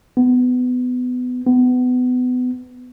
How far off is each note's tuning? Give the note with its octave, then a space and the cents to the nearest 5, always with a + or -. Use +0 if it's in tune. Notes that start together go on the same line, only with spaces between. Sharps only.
B3 +20
B3 +25